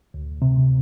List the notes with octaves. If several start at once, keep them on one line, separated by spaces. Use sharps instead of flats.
D2
C3